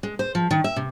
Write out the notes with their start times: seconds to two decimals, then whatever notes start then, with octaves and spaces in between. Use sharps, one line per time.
0.03 G#3
0.19 C5
0.35 F3
0.51 D#3
0.64 E5
0.76 C3